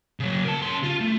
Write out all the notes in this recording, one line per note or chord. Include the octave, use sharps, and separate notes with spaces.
C#3 F#3
A#4 A5
C#3 C6
F4
A3